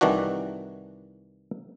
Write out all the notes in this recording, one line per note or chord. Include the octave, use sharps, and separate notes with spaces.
C2 D#3 E3 D4 F#4